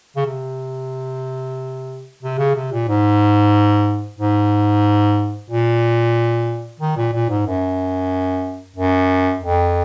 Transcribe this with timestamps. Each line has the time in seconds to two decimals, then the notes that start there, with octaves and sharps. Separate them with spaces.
0.17 C#3
0.26 C3
2.23 C3
2.39 C#3
2.55 C3
2.72 A#2
2.88 G#2
4.19 G#2
5.50 A#2
6.80 D#3
6.97 A#2
7.13 A#2
7.29 G#2
7.46 F#2
8.76 F#2
9.41 F2